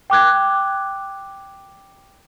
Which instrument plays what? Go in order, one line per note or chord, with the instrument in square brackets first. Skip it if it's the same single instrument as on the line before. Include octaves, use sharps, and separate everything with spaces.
[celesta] G5 D6 F#6 G#6